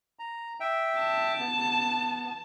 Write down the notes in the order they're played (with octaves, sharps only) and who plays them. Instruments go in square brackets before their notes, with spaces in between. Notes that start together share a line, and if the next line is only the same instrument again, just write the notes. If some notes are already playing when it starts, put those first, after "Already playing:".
[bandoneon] A#5
E5 G5
[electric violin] A5
[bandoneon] B3